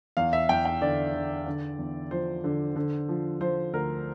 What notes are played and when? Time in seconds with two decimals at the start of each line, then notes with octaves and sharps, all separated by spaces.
0.17 E2 F5
0.33 E5
0.49 E2 G5
0.65 G5
0.82 D3 D5
1.14 D3
1.46 D3
1.79 E2
2.11 F3 C5
2.44 D3
2.76 D3
3.09 F3
3.40 F3 C5
3.73 D2 A#4